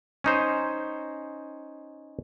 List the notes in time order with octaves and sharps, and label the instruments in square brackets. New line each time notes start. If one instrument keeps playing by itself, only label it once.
[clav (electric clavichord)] C#4 D#4 C5